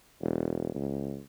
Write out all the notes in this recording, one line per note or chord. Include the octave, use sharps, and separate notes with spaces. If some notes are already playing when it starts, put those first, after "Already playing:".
E1
C#2